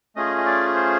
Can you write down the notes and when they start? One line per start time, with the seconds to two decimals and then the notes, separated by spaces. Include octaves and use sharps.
0.16 A3 C#4 F4 G#4 D#5
0.38 D#5
0.46 D5
0.75 C5